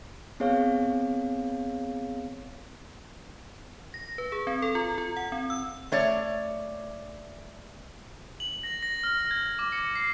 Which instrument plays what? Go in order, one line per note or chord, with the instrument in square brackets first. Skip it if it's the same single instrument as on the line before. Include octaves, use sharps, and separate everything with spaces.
[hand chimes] B3 C4 G#4 C#5 F5
[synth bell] A#6
B4
G#4
C4
A4
F4
F4
F#5
C4
E6
[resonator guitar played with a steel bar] A3 C#5 D5
[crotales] F#7
A#6
A#6
F6
G#6
D6
C#7
C7